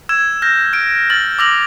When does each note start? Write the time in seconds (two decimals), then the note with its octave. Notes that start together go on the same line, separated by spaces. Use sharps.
0.09 E6 G#6 E7
0.42 F6 G6 A#6
0.73 F6 D7
1.10 F6 A6 F#7
1.39 D6 E6 A#6 F7 F#7